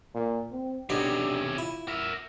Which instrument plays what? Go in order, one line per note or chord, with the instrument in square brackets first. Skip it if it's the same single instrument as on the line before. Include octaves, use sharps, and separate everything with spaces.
[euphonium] A#2
C4
[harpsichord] B1 G4 D#5 [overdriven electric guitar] C3 C#4 [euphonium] D4
[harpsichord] E4 [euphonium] F4
[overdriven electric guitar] A#4 E5